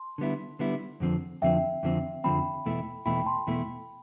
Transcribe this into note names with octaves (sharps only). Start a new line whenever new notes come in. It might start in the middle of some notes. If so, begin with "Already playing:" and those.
Already playing: A5 C6
D3 G3 B3 E4
D3 G3 B3 E4
F2 D3 F3 C4
F2 D3 F3 C4 E5 G5
F2 D3 F3 C4
F2 D3 F3 C4 G5 B5
E2 B2 A3 E4
E2 B2 A3 E4 G5 B5
G5 B5
A5 C6
G5 B5
E2 B2 A3 E4